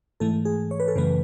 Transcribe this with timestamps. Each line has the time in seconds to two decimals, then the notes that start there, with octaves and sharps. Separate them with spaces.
0.20 G#2 E3 A3 A4
0.45 G#4
0.71 C#5
0.80 B4
0.88 A4
0.95 F#2 C#3 E3 A3 B4